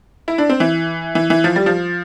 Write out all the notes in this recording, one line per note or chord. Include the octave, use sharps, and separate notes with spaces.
E4
D4
C4
E3
E3
E3
F3
G3
F3